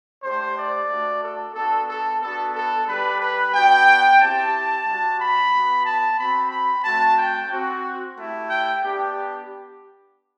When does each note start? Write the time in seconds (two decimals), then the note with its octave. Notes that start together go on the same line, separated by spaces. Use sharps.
0.23 A3 D4 G4 C5
0.57 D5
0.89 A3 D4 F#4
1.22 A4
1.55 B3 D4 F#4 A4
1.89 A4
2.22 B3 D4 F#4 A4
2.55 A4
2.88 G3 D4 G4 B4
3.20 B4
3.53 B3 D4 F#4 G5
4.20 C4 E4 G4 A5
4.86 G3 D4 F#4
5.19 B5
5.52 B3 F#4
5.85 A5
6.18 C4 F#4 B5
6.51 B5
6.84 A3 C4 F#4 A5
7.17 G5
7.51 C4 F#4
8.17 A3 E4 G4
8.50 G5
8.83 B3 D4 G4